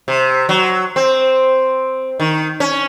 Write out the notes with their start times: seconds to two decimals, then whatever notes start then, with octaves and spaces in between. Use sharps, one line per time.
0.08 C3
0.49 F#3
0.96 C4
2.20 D#3
2.60 C#4